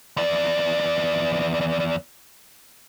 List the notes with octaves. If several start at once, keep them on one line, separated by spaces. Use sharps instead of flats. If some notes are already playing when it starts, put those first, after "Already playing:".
E2 D5